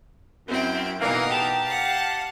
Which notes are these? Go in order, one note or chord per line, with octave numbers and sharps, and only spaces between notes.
F#2 C4 E4 G5
B2 E3 A#3 D#4 A#4
G4 A5
F5 F#5